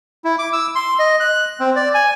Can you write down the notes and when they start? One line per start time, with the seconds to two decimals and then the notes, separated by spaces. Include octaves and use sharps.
0.24 E4
0.39 D6
0.53 E6
0.75 C6
0.99 D#5
1.20 F#6
1.60 C4
1.76 D5
1.94 G#5